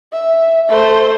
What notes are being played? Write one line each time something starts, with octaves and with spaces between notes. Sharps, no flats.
E5
A3 C5